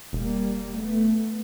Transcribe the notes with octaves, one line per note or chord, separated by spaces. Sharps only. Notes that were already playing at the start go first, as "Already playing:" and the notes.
E1 G3 A#3
A3 B3